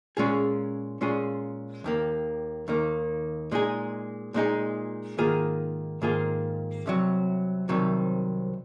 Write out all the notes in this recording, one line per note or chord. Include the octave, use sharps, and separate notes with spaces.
A#2 G#3 C#4 F4 G#4
A#2 G#3 C#4 F4 G#4
D#2 D#3 A#3
D#2 D#3 A#3
A#2 G#3 D#4 G#4
A#2 G#3 D#4 G#4
G#2 D#3 A#3 F4 G#4
G#2 D#3 A#3 F4 G#4
C2 C3 D#3 F#3
C2 C3 D#3 F#3